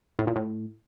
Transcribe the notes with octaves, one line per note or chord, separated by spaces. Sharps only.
A2
A#2
A2